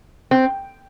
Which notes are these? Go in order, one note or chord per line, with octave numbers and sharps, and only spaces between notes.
C4